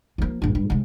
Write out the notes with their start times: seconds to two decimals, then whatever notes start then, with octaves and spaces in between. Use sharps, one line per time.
0.18 F3 A#3
0.42 A#1 G2
0.55 G2
0.70 C3 G#3